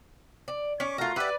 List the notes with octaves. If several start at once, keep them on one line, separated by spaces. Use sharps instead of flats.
D5
C#4 C#6 D6
A3 F4 F#4 A#4 A#5
G4 B4 D5 E5 F#5